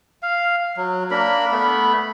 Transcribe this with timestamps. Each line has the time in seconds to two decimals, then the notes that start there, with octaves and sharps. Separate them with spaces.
0.23 F5
0.77 F#3
1.11 A#3 D4 A#4 B5
1.51 A3 B3 B5